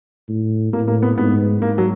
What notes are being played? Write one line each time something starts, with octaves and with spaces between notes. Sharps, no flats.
A2
A2 A#3
A#3
B3
G#2 B3
G#2 A#3
F#3